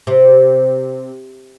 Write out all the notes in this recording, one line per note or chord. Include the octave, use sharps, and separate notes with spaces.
C3